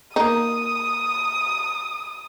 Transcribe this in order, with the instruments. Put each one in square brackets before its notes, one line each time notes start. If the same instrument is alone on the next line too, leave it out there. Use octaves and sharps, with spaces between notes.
[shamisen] A#3 D#4 [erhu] D#6